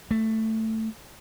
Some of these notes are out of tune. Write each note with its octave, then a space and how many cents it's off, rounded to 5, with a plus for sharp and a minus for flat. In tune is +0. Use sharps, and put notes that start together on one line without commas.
A3 +10